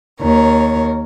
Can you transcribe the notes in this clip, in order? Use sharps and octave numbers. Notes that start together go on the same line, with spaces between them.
D#2 A#4 C#5